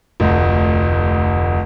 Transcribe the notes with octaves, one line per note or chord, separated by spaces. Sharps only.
F1 D2